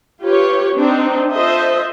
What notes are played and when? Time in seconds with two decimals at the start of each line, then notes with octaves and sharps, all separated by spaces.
0.22 F4 G4 B4 C#5
0.76 C4 D4 D#4
1.32 F4 A4 C5 D#5 E5